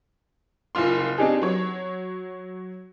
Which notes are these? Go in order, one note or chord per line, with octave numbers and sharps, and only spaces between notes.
F#1 C2 F4 C6
C4 D4 D#4 G4 G#4
F#3 C#5